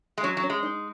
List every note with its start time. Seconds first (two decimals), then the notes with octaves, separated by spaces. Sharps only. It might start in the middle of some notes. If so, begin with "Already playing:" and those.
0.18 G#3
0.23 F#3 C#4
0.37 F#3
0.43 C#4
0.50 G#3
0.63 D#4